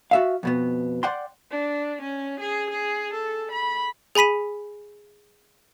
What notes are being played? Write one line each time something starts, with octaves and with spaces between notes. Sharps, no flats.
F#4 E5 F5
F2 B2 B3
D5 F#5 G5 C6
D4
C#4
G#4
G#4
A4
B5
G#4 G#5 B5 B6 D#7